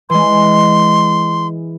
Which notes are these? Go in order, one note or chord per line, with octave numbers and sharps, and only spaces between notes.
E3 G#3 C6